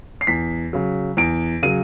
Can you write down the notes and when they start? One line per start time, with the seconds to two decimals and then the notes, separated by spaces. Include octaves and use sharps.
0.21 C7
0.27 E2 B6
0.73 C#3 F#3
1.17 E2 D7
1.63 C#3 F#3 D#7